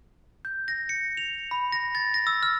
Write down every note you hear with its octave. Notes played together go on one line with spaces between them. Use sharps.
G6
A#6
C#7
F7
B5
A#6
A6
A#6
E6
F6